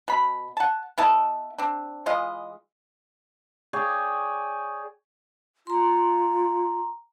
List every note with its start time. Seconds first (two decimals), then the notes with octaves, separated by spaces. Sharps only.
0.08 B2 B5
0.57 F#5 A5
0.98 B3 E4 D#5 A5
1.58 C4 D4
2.06 E3 G#3 F4 D#5
3.73 G#4 C#5 D5 G5
5.67 F4 A#5 C6